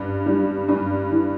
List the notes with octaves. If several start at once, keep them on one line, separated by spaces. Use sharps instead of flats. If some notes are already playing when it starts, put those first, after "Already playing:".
Already playing: G2
G3
G2
E3